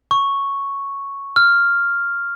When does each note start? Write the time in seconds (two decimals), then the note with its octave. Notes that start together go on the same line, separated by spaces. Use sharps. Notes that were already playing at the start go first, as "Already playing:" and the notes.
0.11 C#6
1.36 F6